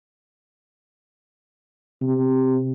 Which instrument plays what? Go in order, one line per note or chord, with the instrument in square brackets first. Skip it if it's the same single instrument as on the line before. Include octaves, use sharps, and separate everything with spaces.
[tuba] C3